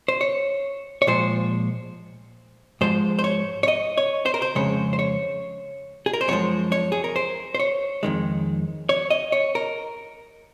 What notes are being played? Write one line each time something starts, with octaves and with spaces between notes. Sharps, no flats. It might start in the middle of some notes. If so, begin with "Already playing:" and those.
C5
C#5
C#5
A#2 F3 G#3 C5
G#2 F3 G#3 C5
C5
C#5
C#5
D#5
C#5
C5
A#4
C5
F2 C#3 G#3 C#5
C5
C#5
G#4
A#4
C5
F#2 F3 G#3 C#5
C#5
G#4
A#4
C5
C5
C#5
F2 D#3 G#3
C#5
D#5
C#5
A#4